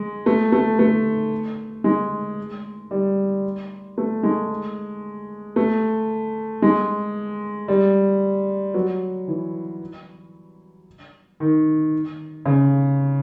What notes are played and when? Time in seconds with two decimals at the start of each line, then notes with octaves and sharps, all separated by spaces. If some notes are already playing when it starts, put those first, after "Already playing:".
Already playing: G#3
0.26 A3
0.52 A3
0.79 A3
1.84 G#3
2.91 G3
3.98 A3
4.23 G#3
5.56 A3
6.62 G#3
7.68 G3
8.74 F#3
9.28 E3
11.40 D#3
12.46 C#3